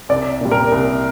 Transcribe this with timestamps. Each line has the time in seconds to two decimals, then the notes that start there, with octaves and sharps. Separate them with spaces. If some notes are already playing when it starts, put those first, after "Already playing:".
0.09 C2 D5
0.41 A#2 G3
0.51 A#4
0.72 C2